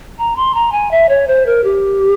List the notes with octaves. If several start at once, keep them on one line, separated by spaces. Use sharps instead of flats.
A#5
C6
A#5
G#5
E5
C#5
C5
A#4
G4